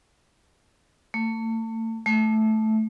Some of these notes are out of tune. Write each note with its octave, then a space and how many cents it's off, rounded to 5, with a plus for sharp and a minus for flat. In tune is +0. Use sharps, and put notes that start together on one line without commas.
A3 +35
A3 -10